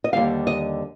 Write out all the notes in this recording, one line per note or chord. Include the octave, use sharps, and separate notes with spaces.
D#5
D#2 D3 G3 F5
D#5